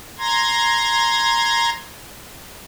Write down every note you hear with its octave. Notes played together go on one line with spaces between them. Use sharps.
A#5 C6 G#6 A#6